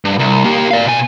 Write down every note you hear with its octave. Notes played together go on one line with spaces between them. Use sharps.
G2
C2
A#3 G4
D5 F5
B2 G#5